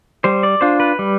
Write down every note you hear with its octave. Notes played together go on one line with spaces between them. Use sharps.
G3 C5
D5
D4 F4 C5
B4
G3